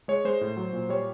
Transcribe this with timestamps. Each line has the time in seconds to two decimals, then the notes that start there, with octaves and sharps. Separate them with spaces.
0.08 G#3 C#5
0.25 G#3 C5
0.41 A2
0.57 F#3
0.73 A#2
0.89 G3 C#5